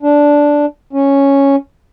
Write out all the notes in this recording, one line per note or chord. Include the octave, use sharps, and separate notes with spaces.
D4
C#4